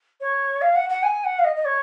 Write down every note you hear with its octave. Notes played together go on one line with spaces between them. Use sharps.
C#5
F5
F#5
F#5
G#5
F#5
F5
D#5
D#5
C#5